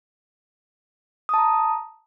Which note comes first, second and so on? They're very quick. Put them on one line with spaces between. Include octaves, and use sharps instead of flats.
D#6 A5 A#5